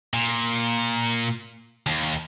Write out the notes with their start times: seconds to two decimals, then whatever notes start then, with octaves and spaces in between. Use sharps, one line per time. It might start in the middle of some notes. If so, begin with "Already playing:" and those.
0.14 A#2
1.86 D#2